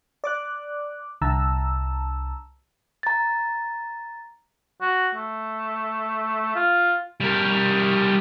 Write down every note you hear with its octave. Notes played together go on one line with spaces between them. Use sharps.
D5 D6 F#6
C2 D3 A5 A#5 E6
A#5 A6
F#4
A3
F4
G3 A#4